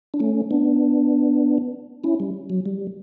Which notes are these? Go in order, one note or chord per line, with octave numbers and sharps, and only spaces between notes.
D4
A3 C#4
B3 D4
C#4 E4
G3
F#3
G3